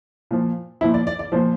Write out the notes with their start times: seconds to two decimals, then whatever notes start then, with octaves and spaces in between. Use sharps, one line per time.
0.31 A#2 F3
0.81 A#2 F3 E4
0.94 D5
1.07 D5
1.19 D5
1.32 A#2 F3 C5